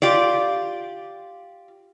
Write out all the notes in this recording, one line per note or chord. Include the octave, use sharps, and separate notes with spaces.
F4 G4 D5